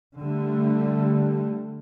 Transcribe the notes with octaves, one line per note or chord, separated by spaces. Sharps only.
D3 G3 A3